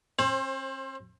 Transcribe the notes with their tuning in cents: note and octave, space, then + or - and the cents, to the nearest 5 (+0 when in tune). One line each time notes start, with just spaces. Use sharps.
C4 +45 C5 +25